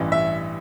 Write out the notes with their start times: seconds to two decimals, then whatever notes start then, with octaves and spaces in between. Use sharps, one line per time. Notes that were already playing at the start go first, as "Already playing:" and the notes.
Already playing: A1 G2 E3
0.12 E5